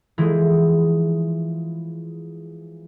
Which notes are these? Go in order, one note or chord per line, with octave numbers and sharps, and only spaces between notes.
E3 F3 G#3